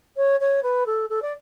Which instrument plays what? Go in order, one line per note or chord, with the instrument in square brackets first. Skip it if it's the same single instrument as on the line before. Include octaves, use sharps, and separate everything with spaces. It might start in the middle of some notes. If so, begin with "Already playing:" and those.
[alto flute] C#5
C#5
B4
A4
A4
D5